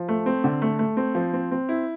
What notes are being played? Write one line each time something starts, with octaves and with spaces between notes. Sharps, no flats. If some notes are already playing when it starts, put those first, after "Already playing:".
Already playing: F3
A3
C4
D3
A3
A3
C4
F3
C4
C4
E4